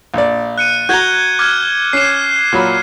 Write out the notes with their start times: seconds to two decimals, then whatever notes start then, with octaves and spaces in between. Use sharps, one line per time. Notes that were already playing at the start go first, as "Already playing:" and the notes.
0.14 A#1 D5
0.58 F#6 C#7 D#7
0.89 F#4 A#5 G6 G#6 G7
1.39 D6 F6 G#6
1.93 C#4 C7 E7
2.53 A#2 F#3 B5